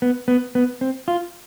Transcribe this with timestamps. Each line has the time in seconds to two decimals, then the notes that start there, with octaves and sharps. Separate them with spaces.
0.02 B3
0.28 B3
0.55 B3
0.81 C4
1.08 F4